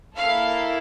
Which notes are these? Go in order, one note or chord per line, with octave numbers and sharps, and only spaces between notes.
A#3 E4 A4 F5